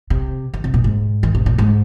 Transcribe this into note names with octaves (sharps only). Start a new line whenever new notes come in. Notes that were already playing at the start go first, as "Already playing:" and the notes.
C3
D#3
C3
A#2
G#2
D#3
C3
A#2
G#2